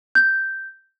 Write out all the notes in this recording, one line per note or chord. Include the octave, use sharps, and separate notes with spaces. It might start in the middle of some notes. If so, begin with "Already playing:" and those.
G6